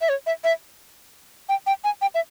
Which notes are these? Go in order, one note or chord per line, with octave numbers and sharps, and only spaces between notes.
E5
C#5
E5
E5
G5
G5
G#5
G5
E5